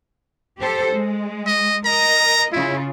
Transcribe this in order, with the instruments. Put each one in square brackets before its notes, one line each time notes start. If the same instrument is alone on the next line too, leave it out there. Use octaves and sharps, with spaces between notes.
[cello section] G4 A4 C5
G#3
[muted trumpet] D#5
[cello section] A#4 D#5 [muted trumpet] A#5
[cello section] C#3 F4 [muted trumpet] E4